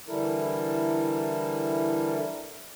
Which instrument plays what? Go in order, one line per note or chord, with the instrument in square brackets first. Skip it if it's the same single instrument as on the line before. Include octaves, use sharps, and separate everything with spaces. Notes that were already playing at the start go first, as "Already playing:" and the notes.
[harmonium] D3 E3 G3 E4 A4 A#4